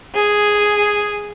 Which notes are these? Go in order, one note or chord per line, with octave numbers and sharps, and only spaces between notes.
G#4